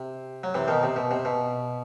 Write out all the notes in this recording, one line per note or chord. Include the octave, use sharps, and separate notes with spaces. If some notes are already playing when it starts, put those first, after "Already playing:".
Already playing: C3
F#3
C3 E3
B2 D#3
C3
B2
C3
B2